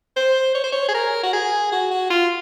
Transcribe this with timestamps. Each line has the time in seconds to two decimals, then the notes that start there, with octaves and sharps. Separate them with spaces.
0.16 C5
0.55 C#5
0.64 C5
0.72 C#5
0.88 G#4
0.94 A#4
1.23 F#4
1.33 G#4
1.72 F#4
1.91 F#4
2.10 F4